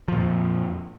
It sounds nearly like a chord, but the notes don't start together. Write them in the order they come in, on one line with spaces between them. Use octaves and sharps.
F3 A#2 F2